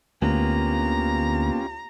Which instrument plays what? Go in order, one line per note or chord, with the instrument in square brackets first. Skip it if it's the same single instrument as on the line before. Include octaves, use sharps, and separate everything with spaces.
[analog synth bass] D2 [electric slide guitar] A#3 B3 [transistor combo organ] C#4 F4 G4 [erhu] A#5